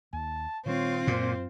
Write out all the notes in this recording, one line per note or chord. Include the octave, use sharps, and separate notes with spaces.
D#2 A5
A#2 D#3 G3 C4 F4 C#5
F#2 A#2 C5